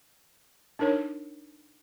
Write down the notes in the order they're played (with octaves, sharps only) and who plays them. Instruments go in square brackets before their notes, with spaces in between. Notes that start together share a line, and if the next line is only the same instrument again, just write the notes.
[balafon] D4 D#4 A#4 C#5